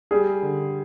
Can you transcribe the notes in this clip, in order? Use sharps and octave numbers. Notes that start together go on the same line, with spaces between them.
G3 G#4
D3